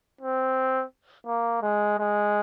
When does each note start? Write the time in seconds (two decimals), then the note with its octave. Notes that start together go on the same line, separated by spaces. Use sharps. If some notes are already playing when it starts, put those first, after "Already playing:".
0.21 C4
1.27 A#3
1.62 G#3
1.99 G#3